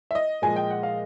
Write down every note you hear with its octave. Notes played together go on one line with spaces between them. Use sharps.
E5
D#5
A#2 F3 G#3 G#5
G5
F#5
F5